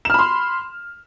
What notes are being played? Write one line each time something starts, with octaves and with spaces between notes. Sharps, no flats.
B5 C6 F6 E7